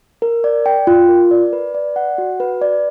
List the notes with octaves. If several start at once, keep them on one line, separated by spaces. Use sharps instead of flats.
A#4
D5
G5
F4
A#4
D5
B4
D5
F#5
F#4
B4
D5